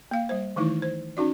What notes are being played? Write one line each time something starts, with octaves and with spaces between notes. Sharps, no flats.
A#3 F5
G3 C5
D#3 E3 A3 D#4 E4
C5
C#4 D#4 F#4 D5